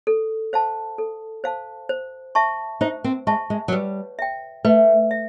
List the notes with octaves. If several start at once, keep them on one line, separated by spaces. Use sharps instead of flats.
A4
C5 F5 A5
A4
C5 F5 A5
C5
E5 A5 C#6
D#4 C5
C4
G#3 E5 A5 C#6
G#3
F#3
G3 B4
E5 G5
A3 B4
E5